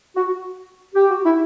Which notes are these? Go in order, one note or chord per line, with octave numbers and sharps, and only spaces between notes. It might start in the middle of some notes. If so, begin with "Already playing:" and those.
F#4
G4
F#4
E4